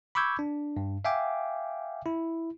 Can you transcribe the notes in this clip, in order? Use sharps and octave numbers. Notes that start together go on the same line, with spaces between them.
B5 C#6 D6 E6 G6 G#6
D4
G2
E5 F5 G5 G#5 D6
E4